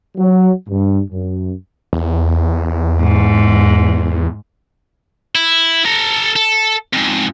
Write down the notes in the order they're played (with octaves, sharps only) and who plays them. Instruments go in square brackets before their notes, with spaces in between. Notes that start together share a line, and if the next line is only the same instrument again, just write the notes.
[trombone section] F#3
G2
F#2
[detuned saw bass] E2
[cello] G#2
[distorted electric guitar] E4
A4 A#5
A4
F2 G#2